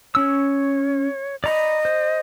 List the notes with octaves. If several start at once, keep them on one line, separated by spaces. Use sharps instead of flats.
C#4 C#5 E6
D5 D#5 A#5 B5
C5